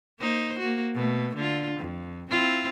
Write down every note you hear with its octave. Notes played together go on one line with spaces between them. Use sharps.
A#3 D#4 C5
A#3 F#4
B2 A3
D3 F4
F2
C4 E4 F4